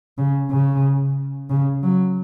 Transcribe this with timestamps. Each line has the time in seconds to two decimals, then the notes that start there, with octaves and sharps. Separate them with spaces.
0.18 C#3
0.51 C#3
1.50 C#3
1.83 F#3